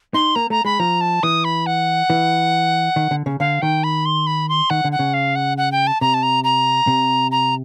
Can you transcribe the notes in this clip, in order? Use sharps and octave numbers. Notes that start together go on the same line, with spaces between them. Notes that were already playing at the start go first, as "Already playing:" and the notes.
D#4 C6
A#3 A#5
A3 A#5
G#3 B5
F3 A#5
A5
E3 D#6
B5
F#5
E3
D#3
D3
C#3
D3 F5
D#3 G5
B5
C6
B5
C6
D#3 F#5
D3
F#5
C#3
F5
F#5
F#5
G5
A5
C3 A#5
A5
A#5
A#5
C3
A#5